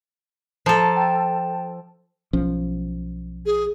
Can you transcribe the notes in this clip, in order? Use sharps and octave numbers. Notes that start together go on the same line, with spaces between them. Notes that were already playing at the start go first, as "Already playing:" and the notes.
F3 A4 A#5 A6
G5 A5
B1 F3 C#4
G#4